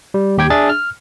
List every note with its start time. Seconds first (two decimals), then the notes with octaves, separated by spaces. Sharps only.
0.14 G3
0.38 D#2 G4 G5 G#6
0.50 D4 G#4 E5 A6
0.69 F6